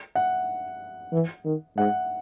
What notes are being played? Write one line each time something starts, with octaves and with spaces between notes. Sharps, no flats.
F#5
E3
D#3
G#2 F#5